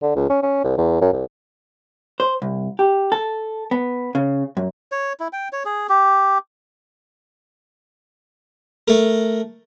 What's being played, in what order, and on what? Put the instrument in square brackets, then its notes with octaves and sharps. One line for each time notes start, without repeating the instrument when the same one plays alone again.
[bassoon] D3
C#2
C#4
C#4
C2
E2
F#2
C2
[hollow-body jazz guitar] C5
C2
G4
A4
B3
C#3
F#2
[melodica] C#5
E4
G5
C#5
G#4
G4
[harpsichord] A3 A#4